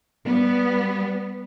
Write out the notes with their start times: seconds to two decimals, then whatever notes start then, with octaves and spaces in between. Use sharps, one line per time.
0.24 G3 B3